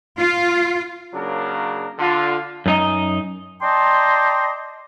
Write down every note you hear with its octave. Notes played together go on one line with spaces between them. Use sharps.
F4
C#3 F#3 A#3 D4 A#4
D3 F4
F#2 D#4 D#5
D5 D#5 G5 A5 A#5 C6